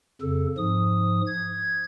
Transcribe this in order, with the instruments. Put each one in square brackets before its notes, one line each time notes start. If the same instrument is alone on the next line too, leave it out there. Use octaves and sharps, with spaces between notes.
[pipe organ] F2 C#3 A4
G#2 F3 D#6
G#6